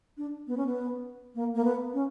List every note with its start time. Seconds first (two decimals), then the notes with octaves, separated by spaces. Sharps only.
0.18 D4
0.47 B3
0.57 C#4
0.66 B3
1.35 A#3
1.55 A#3
1.65 B3
1.94 C#4